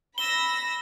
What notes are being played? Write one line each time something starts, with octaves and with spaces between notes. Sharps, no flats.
B5 E6 A#6 G7